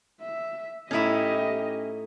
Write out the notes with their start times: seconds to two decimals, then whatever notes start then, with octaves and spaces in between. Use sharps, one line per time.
0.21 E5
0.91 A2 C#4 D#4 E4 G4 D#5 E5